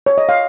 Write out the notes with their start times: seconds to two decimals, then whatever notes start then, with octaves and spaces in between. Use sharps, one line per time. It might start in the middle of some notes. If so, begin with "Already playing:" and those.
0.06 C#5
0.18 D#5
0.29 F5